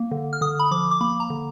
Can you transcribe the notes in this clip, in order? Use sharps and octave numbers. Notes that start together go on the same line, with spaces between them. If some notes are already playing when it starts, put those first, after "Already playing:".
Already playing: A#3
D3
F6
D3 D#6
B5
F3 D6
D6
A#3 B5
A#5
D3